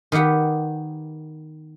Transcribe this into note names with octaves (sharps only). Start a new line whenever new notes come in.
D#3 B3 G4 F#5 B5